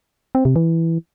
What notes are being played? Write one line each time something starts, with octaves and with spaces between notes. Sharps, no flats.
C4
C3
E3